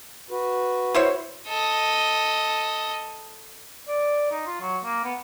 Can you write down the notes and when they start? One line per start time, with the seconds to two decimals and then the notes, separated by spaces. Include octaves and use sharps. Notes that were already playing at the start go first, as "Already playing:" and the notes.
0.30 F#4 B4
0.95 E4 C5 C#5
1.48 A4 D#5
3.88 D5
4.31 D#4
4.46 F4
4.61 F#3
4.84 A#3
5.04 B3